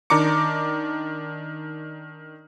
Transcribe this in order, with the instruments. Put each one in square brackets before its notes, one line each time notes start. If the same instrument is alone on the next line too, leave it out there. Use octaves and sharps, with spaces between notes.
[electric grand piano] D#3 D4 A#5 D6 C#7